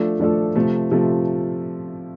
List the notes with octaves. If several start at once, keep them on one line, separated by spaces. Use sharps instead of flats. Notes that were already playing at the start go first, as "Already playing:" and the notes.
Already playing: F3 A3 D4 F4 A4
F3 A3 D4 F4 A4
C3 F3 A3
C3 F3 A3